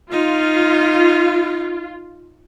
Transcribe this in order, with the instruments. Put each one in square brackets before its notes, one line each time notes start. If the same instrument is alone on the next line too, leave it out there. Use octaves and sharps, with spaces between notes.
[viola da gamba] D#4 [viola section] F4